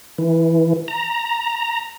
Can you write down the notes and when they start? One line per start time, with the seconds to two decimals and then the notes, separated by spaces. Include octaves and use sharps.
0.18 E3
0.88 A#5